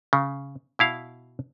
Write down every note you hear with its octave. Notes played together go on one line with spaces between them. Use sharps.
C#3
B2 E4 F5